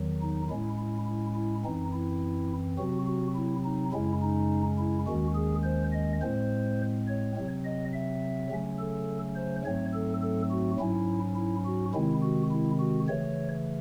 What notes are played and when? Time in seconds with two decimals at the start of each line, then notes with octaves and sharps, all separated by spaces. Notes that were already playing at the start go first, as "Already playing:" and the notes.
Already playing: E2 D#3 F#3
0.21 D#4
0.50 A2 G#3 C#4 E4
0.78 E4
1.07 E4
1.35 E4
1.64 F#2 E3 C4 D#4
1.93 E4
2.78 C3 F#3 C4 F#4
3.07 F#4
3.36 E4
3.65 D#4
3.92 F#2 C#3 G#3 C#4 E4
4.22 D#4
4.79 E4
5.07 D#2 D#3 G#3 C#4 F#4
5.35 G#4
5.64 C5
5.93 D#5
6.22 A2 G#3 C4 C5
7.07 C#5
7.36 C3 F#3 C4
7.65 D#5
7.93 E5
8.50 C#3 F#3 A3 C#4
8.79 A4
9.36 C5
9.65 G#2 F#3 A3 C4 C#5
9.94 A4
10.22 A4
10.51 F#4
10.80 G#2 F#3 C#4 E4
11.36 E4
11.65 F#4
11.94 C3 D#3 G#3 C4 E4
12.22 F#4
12.51 E4
12.79 F#4
13.08 C#3 E3 A3 C#5